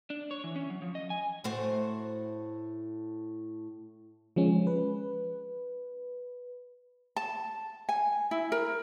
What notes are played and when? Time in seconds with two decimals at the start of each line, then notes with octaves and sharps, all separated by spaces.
0.10 D4
0.31 C#5
0.44 E3
0.56 C#4
0.70 F#3
0.82 F3
0.95 D#5
1.10 G#5
1.44 A2 F#4 C5
4.36 F3 G#3 C#4
4.67 B4
7.16 A5
7.89 G#5
8.31 E4
8.52 A#4